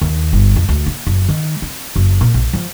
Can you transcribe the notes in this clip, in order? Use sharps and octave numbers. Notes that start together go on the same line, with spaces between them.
D#2
G1
F2
D2
A#3
F#1
D#3
C4
F#1
A#2
A#1
F3